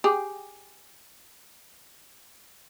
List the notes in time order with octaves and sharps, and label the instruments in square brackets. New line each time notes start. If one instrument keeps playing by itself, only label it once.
[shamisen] G4 G#4